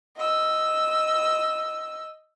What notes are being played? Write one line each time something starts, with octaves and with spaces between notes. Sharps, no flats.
D#5 E6